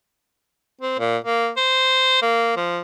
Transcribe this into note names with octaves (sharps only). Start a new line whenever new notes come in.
C4
A#2
A#3
C5
A#3
F3